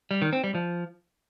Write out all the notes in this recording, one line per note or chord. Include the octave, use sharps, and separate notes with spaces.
G3
D#3
C4
G3
F3